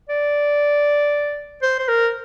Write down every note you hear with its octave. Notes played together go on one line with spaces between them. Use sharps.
D5
C5
C5
A#4